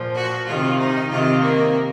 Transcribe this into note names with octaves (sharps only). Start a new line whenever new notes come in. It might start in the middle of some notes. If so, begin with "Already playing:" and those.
Already playing: A#2 F3
F#4
C3 D#3 F4
D#4
C3 D#3 F4
A#3